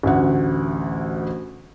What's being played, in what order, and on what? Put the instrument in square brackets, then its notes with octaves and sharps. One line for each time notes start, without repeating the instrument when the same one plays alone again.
[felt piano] A1 D2 F#5